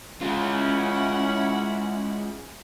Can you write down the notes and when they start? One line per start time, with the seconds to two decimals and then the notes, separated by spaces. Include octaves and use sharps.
0.21 G#3 C#4 E4 F4 F#5